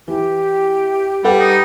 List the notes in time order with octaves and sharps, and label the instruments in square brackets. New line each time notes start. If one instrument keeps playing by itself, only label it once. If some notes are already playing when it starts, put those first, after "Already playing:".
[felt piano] E3 [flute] G4
[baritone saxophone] G3 [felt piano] A4 B4 F#5
[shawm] D#4